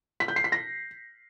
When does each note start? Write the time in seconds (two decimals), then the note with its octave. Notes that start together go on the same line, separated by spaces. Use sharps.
0.20 B6
0.28 G6
0.36 C7
0.44 B6
0.52 A#6